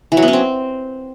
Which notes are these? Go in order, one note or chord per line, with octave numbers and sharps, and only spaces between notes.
E3
F#3
B3
C#4
C4